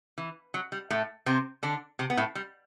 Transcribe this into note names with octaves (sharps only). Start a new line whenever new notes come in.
E3
F#3
G3
A2 A3
C3 C4
D3 D4
C3 C4
B3
A2 A3
G3